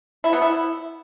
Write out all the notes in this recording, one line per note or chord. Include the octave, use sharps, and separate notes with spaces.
E4
B3
E4